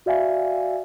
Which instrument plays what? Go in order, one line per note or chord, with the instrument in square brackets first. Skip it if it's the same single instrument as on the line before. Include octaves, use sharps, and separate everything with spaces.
[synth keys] F#4 D5 E5 F5 G#5